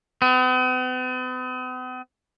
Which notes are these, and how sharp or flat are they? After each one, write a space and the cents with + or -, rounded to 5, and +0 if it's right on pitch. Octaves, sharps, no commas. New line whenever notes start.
B3 +45